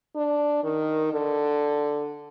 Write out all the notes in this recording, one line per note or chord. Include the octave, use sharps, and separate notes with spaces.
D4
D#3
D3